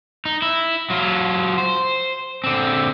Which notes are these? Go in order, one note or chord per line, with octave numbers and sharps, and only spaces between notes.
D#4
E4
F#3 F4
C5
D3 C4